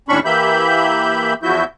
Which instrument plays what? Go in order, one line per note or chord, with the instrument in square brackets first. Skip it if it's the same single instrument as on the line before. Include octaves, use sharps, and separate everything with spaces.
[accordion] D#2 A2 C#4 D4 B5 C#6
E3 A#3 G4 E5 B5 G6
E2 F3 E4 F#4 E5 G6